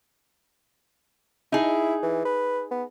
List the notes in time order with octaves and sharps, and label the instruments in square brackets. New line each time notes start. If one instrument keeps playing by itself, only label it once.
[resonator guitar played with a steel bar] D#4 G#4 [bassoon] E4
[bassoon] E3
B4
B3